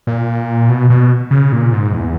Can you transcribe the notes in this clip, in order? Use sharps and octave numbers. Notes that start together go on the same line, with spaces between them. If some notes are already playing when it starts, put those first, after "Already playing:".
A#2
B2
B2
C#3
A#2
G#2
E2